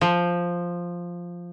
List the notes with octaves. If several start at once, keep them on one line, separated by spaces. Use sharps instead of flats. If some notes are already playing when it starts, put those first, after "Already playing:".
F3